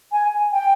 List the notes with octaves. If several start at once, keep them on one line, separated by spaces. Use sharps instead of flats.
G#5
G5